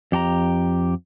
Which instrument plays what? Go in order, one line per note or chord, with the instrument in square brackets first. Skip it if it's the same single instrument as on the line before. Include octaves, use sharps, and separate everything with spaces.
[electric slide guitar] F2 G4 A5 A#5